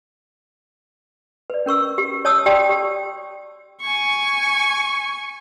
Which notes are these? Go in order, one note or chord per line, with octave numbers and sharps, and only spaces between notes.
B4 D5
C#4 A#4 C#6 E6
G4
C#5 A5 D#6 E6
G4 D5 G5 A5 C6
G4
G#5 C#6